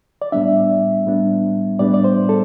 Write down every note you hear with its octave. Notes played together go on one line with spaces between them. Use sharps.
D5
A2 G3 B3 D4 E5
A2 G3 B3 D4
A2 G3 B3 D4 D5
D5
C5
A4